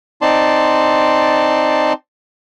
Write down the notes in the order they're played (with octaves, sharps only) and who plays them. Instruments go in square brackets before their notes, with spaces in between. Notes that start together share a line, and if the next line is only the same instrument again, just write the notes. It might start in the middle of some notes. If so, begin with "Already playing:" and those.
[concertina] C4 D#4 D5 A5 C6